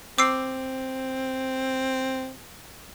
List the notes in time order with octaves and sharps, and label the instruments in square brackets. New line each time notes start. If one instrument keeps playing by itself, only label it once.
[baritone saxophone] C4 [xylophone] D6 E6 C7